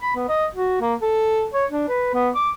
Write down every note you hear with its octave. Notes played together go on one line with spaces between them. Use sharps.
B5
B3
D#5
F#4
A#3
A4
C#5
D4
B4
B3
D6